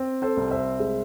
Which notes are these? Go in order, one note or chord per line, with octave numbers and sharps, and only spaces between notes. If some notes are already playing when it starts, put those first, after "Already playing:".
Already playing: C4
A4 C5
C2
C5 E5
G#3